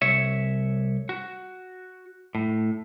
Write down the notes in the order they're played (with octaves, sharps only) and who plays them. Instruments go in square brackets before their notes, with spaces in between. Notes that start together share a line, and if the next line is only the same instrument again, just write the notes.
[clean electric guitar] C2 C#5 E5
F#4
A2